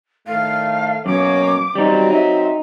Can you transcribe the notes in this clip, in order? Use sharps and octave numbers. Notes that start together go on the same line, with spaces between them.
A2 D#3 A3 F5
F#2 B2 A#3 C#5 D6
F#3 G3 C4 D#4
D#4 E5